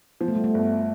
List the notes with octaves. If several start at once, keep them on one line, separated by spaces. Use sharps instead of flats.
F3 B3
A3
G3
A3
G1